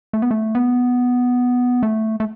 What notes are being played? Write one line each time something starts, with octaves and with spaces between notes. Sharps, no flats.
A3
B3
A3
B3
A3
A3